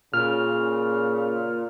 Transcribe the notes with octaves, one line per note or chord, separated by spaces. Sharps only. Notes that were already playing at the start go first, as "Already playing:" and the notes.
A#2 C#3 F6